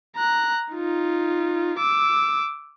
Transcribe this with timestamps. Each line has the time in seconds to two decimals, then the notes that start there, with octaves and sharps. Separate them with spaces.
0.16 A#5 F#6
0.72 D#4 F4
1.78 D6 E6